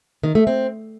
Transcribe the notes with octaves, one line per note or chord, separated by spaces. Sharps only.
D#3
A3
C4